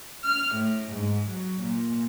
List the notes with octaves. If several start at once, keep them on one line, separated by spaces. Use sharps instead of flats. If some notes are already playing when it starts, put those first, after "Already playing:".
F6
A2
G#2
F#3
A#2